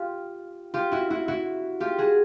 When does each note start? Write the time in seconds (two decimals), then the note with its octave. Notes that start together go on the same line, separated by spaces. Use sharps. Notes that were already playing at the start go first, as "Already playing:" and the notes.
Already playing: F4 G4
0.74 F4 G4
0.92 E4 F#4
1.10 E4 F#4
1.28 E4 F#4
1.80 F4 G4
1.98 F#4 G#4